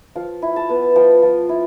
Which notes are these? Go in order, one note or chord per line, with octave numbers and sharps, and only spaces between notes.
F3 F5
E4
A5
B3
F3 G5
F3
E4